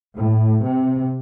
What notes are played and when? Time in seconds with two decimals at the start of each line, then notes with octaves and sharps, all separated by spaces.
0.16 A2
0.64 C3